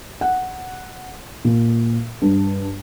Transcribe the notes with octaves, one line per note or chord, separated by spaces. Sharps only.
F#5
A#2
G2